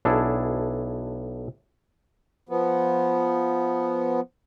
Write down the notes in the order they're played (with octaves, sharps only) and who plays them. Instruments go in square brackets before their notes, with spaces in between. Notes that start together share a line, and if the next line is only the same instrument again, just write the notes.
[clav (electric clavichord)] B1 D4 E4 G#4 A4 E5
[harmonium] F3 B3